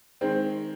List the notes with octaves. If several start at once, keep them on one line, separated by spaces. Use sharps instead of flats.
D#3 G#3 C4